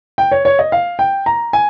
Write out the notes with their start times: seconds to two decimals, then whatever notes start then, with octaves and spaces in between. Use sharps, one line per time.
0.18 G5
0.32 C#5
0.45 C#5
0.59 D#5
0.72 F5
0.99 G5
1.26 A#5
1.53 G#5